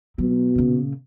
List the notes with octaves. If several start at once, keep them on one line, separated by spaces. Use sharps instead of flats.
B2 F#3
A#2 C#3